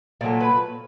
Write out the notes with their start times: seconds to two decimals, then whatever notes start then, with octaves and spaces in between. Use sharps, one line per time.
0.21 A#2 F#3 A3
0.40 B4